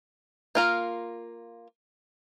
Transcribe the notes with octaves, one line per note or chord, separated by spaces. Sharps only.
A#3 F4 A#4